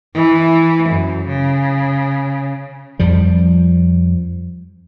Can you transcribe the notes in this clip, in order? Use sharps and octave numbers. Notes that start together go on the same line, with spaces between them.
E3
F#2
C#3
F2 F3 G3